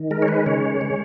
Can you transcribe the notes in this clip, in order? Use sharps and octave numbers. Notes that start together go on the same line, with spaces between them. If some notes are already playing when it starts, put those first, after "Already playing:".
Already playing: D#3
G#3 A#4
C#5
B4
C#3 C#5
G#3